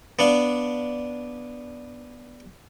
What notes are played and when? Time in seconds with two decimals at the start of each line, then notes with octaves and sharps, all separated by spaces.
0.19 B3 D4 F5